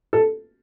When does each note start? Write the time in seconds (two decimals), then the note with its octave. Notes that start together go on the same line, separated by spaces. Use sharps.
0.13 A4